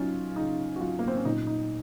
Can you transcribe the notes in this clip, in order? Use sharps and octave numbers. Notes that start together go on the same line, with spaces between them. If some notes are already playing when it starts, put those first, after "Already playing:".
Already playing: C#3 F#3 C#4 D#4 F4
C#3 D#4
F#4
F#3 F4
A#3
C4
C#4
A#2 D#4
D#4